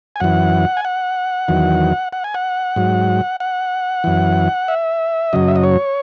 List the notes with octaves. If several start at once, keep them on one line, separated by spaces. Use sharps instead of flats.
G#5
F#2 E3 F#5
G#5
F#5
E2 D#3 F#3
F#5
G#5
F#5
G#2 F#3
F#5
F#2 E3
E5
F#2 C#3 F#3 D#5
E5
D#5
C#5